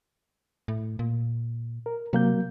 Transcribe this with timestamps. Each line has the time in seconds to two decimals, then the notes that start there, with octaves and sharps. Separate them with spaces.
0.68 A2
0.99 A#2
1.86 A#4
2.13 C3 F#3 A#3 G6